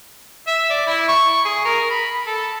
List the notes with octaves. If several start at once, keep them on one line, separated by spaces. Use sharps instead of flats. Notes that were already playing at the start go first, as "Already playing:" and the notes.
E5
D5
E4
C#6
G#4
A#4
B5
A4